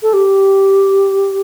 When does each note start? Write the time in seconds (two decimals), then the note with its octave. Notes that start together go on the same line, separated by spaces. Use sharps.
0.03 A4
0.13 G4